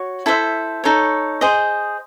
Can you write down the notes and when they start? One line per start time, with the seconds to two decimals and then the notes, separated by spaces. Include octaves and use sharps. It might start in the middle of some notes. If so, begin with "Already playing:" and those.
Already playing: F#4 C#5
0.26 E4 A4 C5 E5
0.84 D#4 A4 C#5
1.41 G#4 C5 D#5